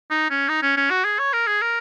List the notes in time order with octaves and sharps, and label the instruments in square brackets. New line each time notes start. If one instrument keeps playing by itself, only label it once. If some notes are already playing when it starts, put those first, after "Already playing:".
[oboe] D#4
C#4
D#4
C#4
C#4
F#4
G#4
C#5
A#4
G#4
A#4